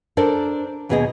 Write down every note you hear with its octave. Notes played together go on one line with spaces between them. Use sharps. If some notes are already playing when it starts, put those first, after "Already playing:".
D4 A4 A#4 C5 D5
D#2 B2 B3 G#4 C#5 D#5